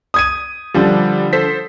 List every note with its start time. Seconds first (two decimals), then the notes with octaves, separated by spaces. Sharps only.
0.14 D#6 G#6 D#7
0.74 D3 F3 G3 D4
1.33 A4 C5 B6